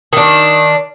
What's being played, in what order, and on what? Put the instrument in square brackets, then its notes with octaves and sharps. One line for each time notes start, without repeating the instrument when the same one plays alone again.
[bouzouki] D#3 D4